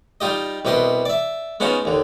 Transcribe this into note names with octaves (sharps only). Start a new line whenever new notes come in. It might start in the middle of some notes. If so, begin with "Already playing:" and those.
G3 D#4 F4 G4 D#5
C2 B2 G4 B4 D#5 C6
D5 E5
G#3 B3 C#4 D#4 F4 F#4
D#2 D3